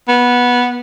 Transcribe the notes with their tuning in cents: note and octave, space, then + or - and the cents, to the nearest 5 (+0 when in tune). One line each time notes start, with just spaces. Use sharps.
B3 -10